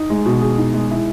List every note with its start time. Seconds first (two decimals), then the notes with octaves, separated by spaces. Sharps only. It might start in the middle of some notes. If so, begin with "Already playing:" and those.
Already playing: D#4
0.10 G#3
0.26 B2
0.41 G#4
0.58 D#4
0.74 G#3
0.90 E4